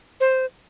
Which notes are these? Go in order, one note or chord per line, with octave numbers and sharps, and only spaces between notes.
C5